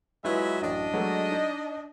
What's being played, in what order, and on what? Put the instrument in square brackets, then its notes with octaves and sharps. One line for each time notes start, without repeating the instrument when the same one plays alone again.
[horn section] F#3 G#3 E5 [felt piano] E4 F4 B4
[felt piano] A1 F#2 [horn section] D4 D#5
[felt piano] F#3 G#3 A3
D#4